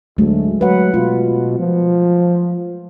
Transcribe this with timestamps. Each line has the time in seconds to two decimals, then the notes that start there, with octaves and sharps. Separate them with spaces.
0.18 D2 F#3 G#3 A3
0.61 F#3 B4 F#5
0.94 B2 F4
1.59 F3